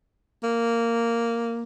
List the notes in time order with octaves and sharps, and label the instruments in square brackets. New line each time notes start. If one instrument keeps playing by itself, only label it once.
[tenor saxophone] A#3